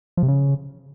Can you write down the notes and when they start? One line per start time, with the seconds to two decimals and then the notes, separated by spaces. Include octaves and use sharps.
0.17 F3
0.23 C3
0.28 C#3